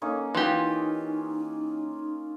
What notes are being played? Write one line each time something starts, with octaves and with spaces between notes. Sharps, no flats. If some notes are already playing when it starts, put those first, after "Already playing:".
A#3 C#4 D#4 A4
E3 D#4 F4 G4